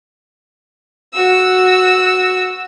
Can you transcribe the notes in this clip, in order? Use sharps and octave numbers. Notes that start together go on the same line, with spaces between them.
F#4 E6